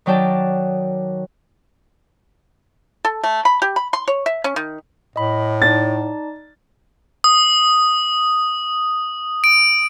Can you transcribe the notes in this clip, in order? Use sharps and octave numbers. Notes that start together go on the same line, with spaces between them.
D#3 F#3 D5 G5 A5
A4
A3
B5
G4
B5
C6
C#5
E5
C#4
D#3
A2 D#5 B5
D#4 D5 A5 A6
D#6
D7